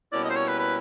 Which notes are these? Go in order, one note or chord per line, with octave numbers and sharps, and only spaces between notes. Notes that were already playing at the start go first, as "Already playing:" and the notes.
B2 G3 A#3 C#4 E4 D5
D#5
C5
C#5
B4
B4